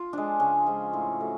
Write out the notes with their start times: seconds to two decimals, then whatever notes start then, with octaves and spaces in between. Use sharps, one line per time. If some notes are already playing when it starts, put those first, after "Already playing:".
Already playing: F4
0.13 F3 G#3 D4
0.40 C#3 C#4
0.66 F3 G#3
0.93 A2
1.20 F#3 A3